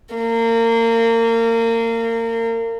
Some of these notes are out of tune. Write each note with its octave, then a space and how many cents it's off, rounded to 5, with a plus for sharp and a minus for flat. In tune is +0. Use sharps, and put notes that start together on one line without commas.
A#3 -30